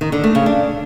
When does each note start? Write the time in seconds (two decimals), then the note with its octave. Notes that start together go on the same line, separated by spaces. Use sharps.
0.01 D#3
0.12 D3
0.24 A3
0.35 C#3
0.46 D4